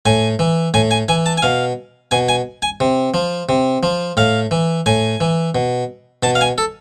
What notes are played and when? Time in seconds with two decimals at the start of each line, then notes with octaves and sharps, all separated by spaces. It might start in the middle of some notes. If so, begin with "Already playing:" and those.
0.05 A2 G#5
0.39 E3
0.74 A2 G#5
0.91 G#5
1.08 E3 G#5
1.26 A5
1.37 G#5
1.42 B2 F5
2.11 B2 G#5
2.29 G#5
2.62 G#5
2.80 C3
3.14 F3
3.49 C3
3.83 F3
4.17 A2 F5
4.51 E3
4.86 A2 G#5
5.21 E3
5.55 B2
6.23 B2 A5
6.35 F5
6.41 G#5
6.58 A4